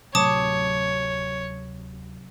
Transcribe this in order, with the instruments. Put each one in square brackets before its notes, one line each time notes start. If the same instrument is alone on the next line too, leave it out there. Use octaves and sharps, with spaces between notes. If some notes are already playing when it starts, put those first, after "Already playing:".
[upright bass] D1 [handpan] C3 F#3 [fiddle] C#5 [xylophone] A5 D6 D#6